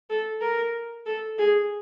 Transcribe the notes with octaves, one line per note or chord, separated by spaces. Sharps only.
A4
A#4
A4
G#4